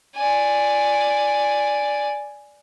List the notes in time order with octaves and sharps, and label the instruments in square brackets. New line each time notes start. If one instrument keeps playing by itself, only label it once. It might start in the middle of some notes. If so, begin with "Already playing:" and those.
[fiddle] D5 G#5